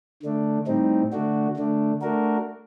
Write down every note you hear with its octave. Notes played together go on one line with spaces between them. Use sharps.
D3 A3 D4
A2 G3 C4 D#4
D3 A3 D4 F#4
D3 A3 D4
A3 D4 F#4 A#4